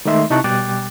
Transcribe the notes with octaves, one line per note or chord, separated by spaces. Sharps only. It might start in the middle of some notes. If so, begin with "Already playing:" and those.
D#3 G#3 A3 D#4 E5 C6
C3 D#4 E4 A5 C#6 F#6
B2 G3 G5 D6 F#6 A6